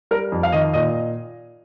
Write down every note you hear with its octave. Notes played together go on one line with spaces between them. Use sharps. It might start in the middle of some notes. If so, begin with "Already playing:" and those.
G3 A#4
F2
F5
D#3 D#5
A#2 D#5